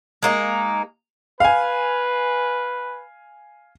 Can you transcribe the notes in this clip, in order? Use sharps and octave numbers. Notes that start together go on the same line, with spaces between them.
G#3 A#3 D#4
B4 F5 G#5